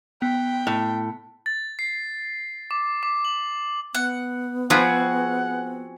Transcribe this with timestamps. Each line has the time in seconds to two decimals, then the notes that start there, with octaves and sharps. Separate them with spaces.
0.22 B3 G5
0.67 A2
1.46 A6
1.79 C7
2.71 D6
3.03 D6
3.25 F#7
3.95 B3 F#5
4.70 F3 C4 F4 F#4 G#4 B4 F#5